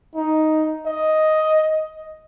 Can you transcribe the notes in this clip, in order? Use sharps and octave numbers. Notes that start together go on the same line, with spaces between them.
D#4
D#5